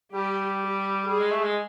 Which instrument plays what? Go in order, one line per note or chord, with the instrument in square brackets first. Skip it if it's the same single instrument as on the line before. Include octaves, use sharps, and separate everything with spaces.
[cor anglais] G3 [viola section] G4
[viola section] G4
[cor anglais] G3 [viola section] G#4
[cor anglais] G#3
A3
G#3